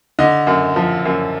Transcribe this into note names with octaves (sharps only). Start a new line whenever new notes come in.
D3 D#5
F#2
F3
F#2